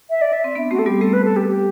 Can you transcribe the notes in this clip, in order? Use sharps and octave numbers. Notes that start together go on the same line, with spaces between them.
E5
D5
E5
C4
B3 D4
A3 C4 F#4
A4
G3 B3 G4
A3 C4 A4
B4
A4
G4
G4